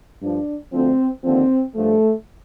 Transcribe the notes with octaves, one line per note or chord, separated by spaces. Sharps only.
G2 F3 D4
D2 D3 F3 C4
D#2 D3 F3 C4
G2 F3 A3